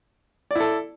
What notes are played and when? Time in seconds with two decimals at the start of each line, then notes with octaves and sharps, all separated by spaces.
0.51 D5
0.55 E4
0.60 A4